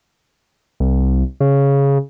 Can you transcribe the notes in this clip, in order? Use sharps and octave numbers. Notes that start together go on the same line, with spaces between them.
C2
C#3